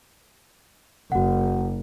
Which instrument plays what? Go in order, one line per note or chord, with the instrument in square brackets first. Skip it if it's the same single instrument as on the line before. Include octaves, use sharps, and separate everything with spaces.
[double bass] F#1 [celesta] F#4 F#5